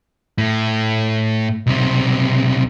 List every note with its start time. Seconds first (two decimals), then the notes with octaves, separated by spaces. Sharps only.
0.38 A2
1.67 B1 C3